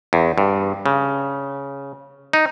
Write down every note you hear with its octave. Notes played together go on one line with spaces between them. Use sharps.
E2
G2
C#3
D#4